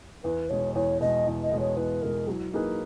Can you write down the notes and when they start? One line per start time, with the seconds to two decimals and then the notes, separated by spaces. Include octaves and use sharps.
0.24 E2 B4
0.50 B2 G#3 C#5
0.75 E2 C#5
1.01 B2 G#3 D#5
1.26 E2
1.43 D#5
1.51 B2 G#3
1.59 C#5
1.76 E2 B4
2.02 B2 G#3 A#4
2.27 F#3 E4 G#4
2.53 A#3 D#4 E4 G#4 B4